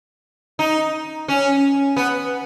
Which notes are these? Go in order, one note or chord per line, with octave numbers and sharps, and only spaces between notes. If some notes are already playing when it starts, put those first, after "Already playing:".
D#4
C#4
B3